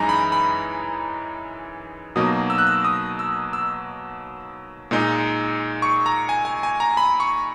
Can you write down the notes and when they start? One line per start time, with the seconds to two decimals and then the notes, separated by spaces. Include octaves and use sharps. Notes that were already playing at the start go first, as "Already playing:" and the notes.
Already playing: F#2 E3 G#3 D#4 G#5 A#5
0.09 B5
0.32 B5
2.16 B2 F#3 A#3 D#4 D#6
2.50 E6
2.58 F#6
2.67 E6
2.85 D#6
3.19 E6
3.53 E6
4.91 A#2 G#3 D#4
5.82 C#6
6.06 A#5
6.29 G#5
6.45 G#5
6.63 G#5
6.80 A#5
6.97 B5
7.20 C#6